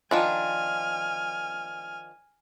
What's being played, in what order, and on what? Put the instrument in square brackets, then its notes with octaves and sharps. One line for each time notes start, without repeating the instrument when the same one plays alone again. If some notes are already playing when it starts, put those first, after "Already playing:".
[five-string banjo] D#3 F3 D4 [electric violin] G#5 F6